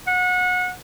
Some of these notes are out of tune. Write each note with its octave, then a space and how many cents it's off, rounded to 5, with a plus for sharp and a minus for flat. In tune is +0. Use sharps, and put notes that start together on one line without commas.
F#5 -25